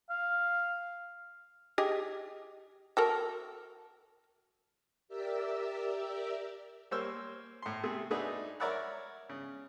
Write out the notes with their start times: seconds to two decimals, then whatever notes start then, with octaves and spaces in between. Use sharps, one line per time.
0.10 F5
1.78 G4 G#4 D#5
2.97 F#4 A4 A#4
5.08 G4 A#4 D5 E5 E6
6.91 G3 A#3 C5 C#5 E6 F6
7.62 A2 C6
7.83 C3 A3 G#4
8.11 A3 D4 D#4 F#4 G#4 B4
8.60 A#4 C#5 D5 E5 F#5 B5
9.29 C#3